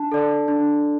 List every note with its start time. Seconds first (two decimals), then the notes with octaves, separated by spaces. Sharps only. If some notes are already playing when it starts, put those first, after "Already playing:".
Already playing: D4 A5
0.12 A4 D5
0.48 D4